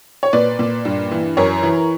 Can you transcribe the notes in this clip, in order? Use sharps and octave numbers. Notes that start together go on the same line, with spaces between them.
C#5
A#2 B4 D5
A#2
G2
E3
F#2 A#4 C#5
E3